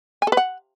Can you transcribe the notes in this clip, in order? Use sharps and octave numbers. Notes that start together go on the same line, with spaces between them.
G#5
A4
B4
F#5